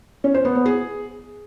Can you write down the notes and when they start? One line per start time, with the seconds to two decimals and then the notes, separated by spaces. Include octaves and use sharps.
0.24 C#4
0.34 C5
0.45 B3
0.55 B3
0.66 G#4